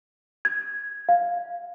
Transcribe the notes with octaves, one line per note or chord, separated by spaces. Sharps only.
G#6
F5